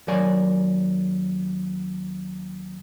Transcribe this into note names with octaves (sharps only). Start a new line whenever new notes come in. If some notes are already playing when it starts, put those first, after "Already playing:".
D#2 F#3 A#4 D5 G#5